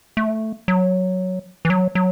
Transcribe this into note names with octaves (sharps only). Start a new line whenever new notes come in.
A3
F#3
E3
F#3
F#3